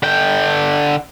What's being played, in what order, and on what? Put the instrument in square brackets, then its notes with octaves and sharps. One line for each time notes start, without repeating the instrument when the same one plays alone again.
[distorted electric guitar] D3 G5